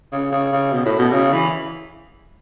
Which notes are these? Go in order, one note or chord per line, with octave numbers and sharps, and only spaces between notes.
C#3
C#3
C#3
B2
A2
B2
C#3
E3